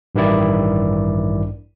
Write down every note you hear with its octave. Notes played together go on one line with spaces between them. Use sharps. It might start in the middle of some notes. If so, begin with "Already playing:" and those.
A1 G2 D#3 E4 D5